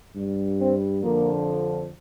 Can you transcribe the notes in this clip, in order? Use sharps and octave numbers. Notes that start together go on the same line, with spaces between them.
G2 G3
C4
F2 D3 F3 A#3